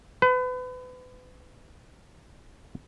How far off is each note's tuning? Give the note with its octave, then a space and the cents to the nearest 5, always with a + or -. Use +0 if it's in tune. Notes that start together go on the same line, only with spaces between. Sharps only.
B4 +35